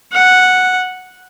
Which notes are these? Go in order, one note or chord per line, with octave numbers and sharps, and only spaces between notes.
F#5